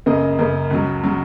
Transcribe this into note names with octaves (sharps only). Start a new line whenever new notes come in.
F#2 C#3 A#3 D#5
F#2 C#3 A#3
C#2 C#3 F#3
C#3 F#3